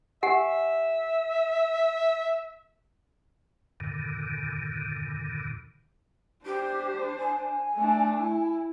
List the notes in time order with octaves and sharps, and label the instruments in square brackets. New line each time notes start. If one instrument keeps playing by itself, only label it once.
[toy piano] G4 F#5 G#5 [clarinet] E5
[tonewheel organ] E2 G2 A#2 D3 D#3
[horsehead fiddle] D4 C5 [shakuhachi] G4
[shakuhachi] G#5
[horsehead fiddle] A3 D4
E4